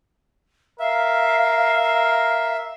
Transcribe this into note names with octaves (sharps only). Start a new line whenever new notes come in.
A#4 E5 F5